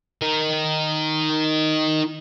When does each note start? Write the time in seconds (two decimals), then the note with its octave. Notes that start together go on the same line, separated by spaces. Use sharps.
0.22 D#4 A#4